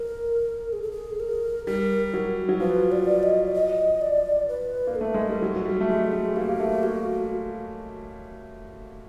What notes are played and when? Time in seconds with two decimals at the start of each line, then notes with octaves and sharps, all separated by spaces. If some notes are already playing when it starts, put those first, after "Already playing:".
Already playing: A#4
0.73 G#4
0.82 A4
0.92 G#4
1.20 A#4
1.67 G3 A#4
2.14 F#3
2.49 F#3
2.60 F3 B4
2.92 D5
3.23 D#5
3.48 D5
3.54 D#5
4.01 D5
4.48 B4
4.87 A#3
4.96 A4
5.01 A3
5.14 G#3
5.29 G3
5.42 F#3
5.56 F#3
5.66 G3
5.80 A3
5.89 G#3 G#4
6.13 A3
6.36 A#3 G4
6.49 A#3
6.60 A3
6.83 A#3 F#4